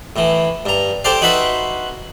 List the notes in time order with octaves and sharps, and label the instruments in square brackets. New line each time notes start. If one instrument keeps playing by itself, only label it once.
[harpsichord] A2 E3
G2 A#5
G4 A4 C5 D5 F5
D#4 F#4 B4 E5 B5 C6